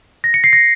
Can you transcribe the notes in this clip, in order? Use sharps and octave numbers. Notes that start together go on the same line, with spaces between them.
A#6
C#7
C7
A#6